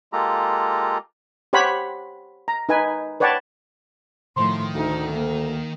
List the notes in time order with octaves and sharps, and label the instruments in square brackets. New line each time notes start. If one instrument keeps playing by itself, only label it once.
[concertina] G#3 A#3 F4 G4 A4 A#5
[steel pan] G4 C5 C#5 F#5 B5
A#5
D#4 B4 G#5
B4 C#5 D5 F#5 G5 A5
[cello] A2 F3 [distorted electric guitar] D#3 [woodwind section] C6
[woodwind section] D2 [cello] D#4
[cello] A#3